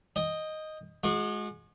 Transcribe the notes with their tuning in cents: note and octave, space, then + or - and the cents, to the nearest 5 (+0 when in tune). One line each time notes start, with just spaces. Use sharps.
D#5 +0 G5 +30
G#3 +15 F#4 -30 D#6 -45